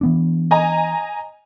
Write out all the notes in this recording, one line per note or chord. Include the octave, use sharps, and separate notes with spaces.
E3 B3 D4
D#5 G#5 A#5